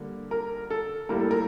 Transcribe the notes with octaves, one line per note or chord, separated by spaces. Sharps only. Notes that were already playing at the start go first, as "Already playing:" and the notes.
Already playing: D3 G3 A#3
A#4
A4
A2 G3 A#3 A#4
A4
A#4